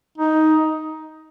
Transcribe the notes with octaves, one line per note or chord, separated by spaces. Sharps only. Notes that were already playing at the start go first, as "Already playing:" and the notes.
D#4